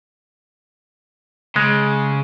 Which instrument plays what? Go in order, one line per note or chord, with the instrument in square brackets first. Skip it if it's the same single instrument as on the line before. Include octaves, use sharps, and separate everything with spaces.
[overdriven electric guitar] C#3 [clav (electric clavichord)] G#3